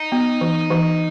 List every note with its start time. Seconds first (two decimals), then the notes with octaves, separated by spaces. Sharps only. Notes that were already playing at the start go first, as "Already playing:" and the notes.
Already playing: D#4
0.12 B3
0.41 E3
0.70 E3